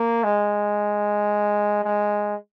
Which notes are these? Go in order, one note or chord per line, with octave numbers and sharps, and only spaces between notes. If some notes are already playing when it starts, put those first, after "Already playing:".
Already playing: A#3
G#3
G#3